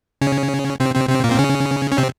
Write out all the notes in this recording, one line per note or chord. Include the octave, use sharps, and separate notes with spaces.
C#3 C#4
C3 C4
C3 C4
C3 C4
A#2 A#3
C4
C#3 C#4
C#4
C3 C4